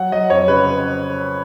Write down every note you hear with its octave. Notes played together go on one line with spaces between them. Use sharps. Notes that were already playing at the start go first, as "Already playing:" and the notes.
Already playing: F#3 F#5
F#3 D#5
F2 C#5
C#3 B4